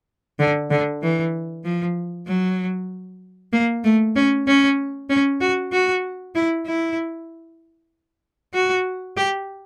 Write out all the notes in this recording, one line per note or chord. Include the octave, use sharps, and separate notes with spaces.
D3
D3
E3
F3
F#3
A#3
A3
C#4
C#4
C#4
F#4
F#4
E4
E4
F#4
G4